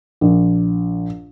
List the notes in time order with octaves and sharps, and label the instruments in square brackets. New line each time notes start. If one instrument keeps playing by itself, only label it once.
[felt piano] A#1